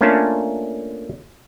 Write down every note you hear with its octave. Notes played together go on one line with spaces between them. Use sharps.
A3 A#3 C#4 D4 F4 A5